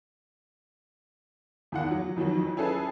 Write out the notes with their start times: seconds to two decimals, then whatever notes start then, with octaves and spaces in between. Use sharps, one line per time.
1.72 E2 D#3 F#5
1.91 F#3
2.16 F2 D#3 E3 F#3
2.57 C#4 E4 G#4 A4 B4